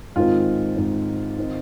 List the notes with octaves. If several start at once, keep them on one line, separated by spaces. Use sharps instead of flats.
G#2 D#3 G#3 C4 F4
G#2 D#3 G#3 C4
D#3 C4 D#4